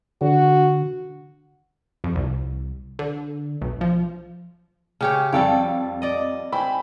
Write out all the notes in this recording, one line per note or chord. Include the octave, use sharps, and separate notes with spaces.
D3 F#4
F2
C2
D3
B1
F3
C#3 G4 C#5
F2 G3 A4 C#5 F5 D7
D5 D#5
C4 G#5 B5